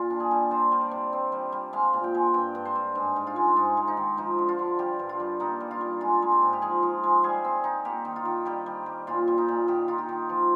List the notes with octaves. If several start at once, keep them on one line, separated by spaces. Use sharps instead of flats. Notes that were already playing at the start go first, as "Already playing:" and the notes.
Already playing: A#2 F4
D4
G#4
G3
D4 C5
G3
D5
C3
C4
G3
G3
G#3 F5
A#2
G5
G#3
G2 G5
G2
C5
G2
G#2
G#2
F4
G#3
G#2 D#4
G#3
D#4
D#3
F3 D#4
D3
F4
D3
G3 G4
G2
F4
G3
A#3 D#4
G3
F4
G3
G#3 F4
G#3
G4
G#2
G4
F3 G#4
F3
G#3
G3 G#4
C4
D#4
A#3 G4
D#3
F4
D#3
G3 G4
G3
G3
A#2 F4
G3
D#4
A#2
D#3 G4
D#4 F4
G4
D#3
F3